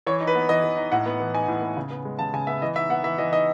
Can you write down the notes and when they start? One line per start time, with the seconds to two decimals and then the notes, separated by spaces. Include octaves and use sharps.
0.07 E3 C#5
0.21 D#4
0.27 B4
0.35 B3
0.49 E3 D#5
0.64 E3
0.77 D#4
0.92 A2 F#5
1.06 B3
1.20 E3
1.35 D#4 G#5
1.48 A2
1.62 B3
1.77 C#3
1.91 B3
2.05 G#3
2.19 C#3 A5
2.33 C#3 G#5
2.47 B3 E5
2.62 E3 D#5
2.76 D#4 E5
2.89 B3 F#5
3.04 E3 E5
3.18 E3 D#5
3.32 D#4 D#5